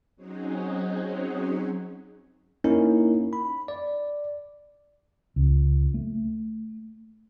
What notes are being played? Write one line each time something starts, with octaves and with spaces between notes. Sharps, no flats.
F#3 C4 C#4 D#4 F#4 G#4
A#3 C#4 D#4 E4 A#4
B5
D5
C#2
A3